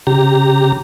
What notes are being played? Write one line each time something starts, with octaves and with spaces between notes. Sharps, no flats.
C#3 G4 A#5